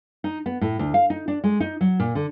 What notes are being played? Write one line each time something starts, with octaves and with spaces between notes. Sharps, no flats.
D#4
B3
A2
D2
F5
D#4
D4
G#3
D#4
F#3
A#2
D3